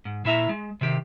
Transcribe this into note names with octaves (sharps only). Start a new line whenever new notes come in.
G#2
A#2 E4 E5 A#5
G#3
C3 D#3 G4